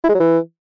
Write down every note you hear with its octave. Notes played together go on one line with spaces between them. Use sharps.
E4
G#3
F#3
E3